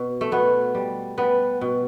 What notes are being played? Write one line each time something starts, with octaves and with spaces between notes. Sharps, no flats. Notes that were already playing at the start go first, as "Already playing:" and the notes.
Already playing: B2
A3
B2 B3
G3
G3 B3
B2